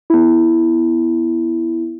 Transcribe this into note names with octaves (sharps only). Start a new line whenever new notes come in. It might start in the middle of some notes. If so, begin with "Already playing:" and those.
B3 E4